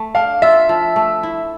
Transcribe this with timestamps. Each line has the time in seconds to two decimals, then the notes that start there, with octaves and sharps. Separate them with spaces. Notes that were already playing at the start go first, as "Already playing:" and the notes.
Already playing: A3
0.15 D4 F5
0.42 F4 E5
0.69 F3
0.96 A3
1.23 E4